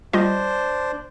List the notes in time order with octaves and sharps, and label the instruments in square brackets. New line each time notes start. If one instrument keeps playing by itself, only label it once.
[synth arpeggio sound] G3 F4 D#5 [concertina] D4 C5